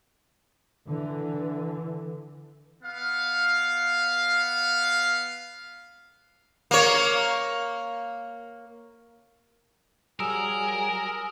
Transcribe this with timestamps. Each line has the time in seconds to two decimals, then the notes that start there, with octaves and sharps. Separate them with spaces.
0.88 D3 E3
2.83 B3 F5
6.71 A#3 C#5
10.20 F#3 G3 G#4 A#4 G#5 D#6 E6 E7